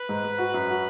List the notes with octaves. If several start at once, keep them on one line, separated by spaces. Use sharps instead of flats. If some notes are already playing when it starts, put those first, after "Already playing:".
Already playing: B4
G#2
G#2
F#4
F#2
F#4